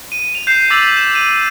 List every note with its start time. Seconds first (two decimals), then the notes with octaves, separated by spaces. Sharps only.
0.12 D#7
0.35 F7
0.47 G6 C7 E7
0.70 D6 E6 A6 B6 F7 F#7
0.97 E7
1.15 D#7